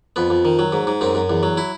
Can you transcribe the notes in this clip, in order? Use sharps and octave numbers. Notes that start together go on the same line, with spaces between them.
F2 B3
F2
D#3
F#3
G#2
G#2
F#2 C4
F#2
E2
F#3
E4